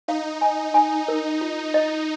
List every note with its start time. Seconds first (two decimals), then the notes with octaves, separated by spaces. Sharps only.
0.08 D#4 F5
0.41 G#5
0.74 G#5
1.08 A#4
1.41 F4
1.74 D#5